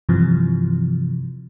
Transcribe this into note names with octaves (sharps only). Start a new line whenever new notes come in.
G2 C3 E3 F3